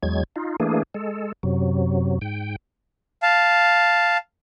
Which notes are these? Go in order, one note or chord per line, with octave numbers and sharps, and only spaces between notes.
E2 F#3 G#3 G#6
D#4 F4
E3 A3 A#3 D4 G#4
G#3 A4
F#2 C3 F#3
G#2 G5
F5 A5